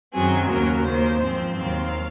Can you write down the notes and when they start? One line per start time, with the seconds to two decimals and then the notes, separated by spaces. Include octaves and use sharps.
0.12 F#2 D#3 F#3 C4 G#4
0.48 D#2 C#3 F#3 A#3 A#4
0.83 D#2 D#3 A#3 C5
1.18 G#2 F3 C4
1.54 D#2 D#3 F#3 C4 F5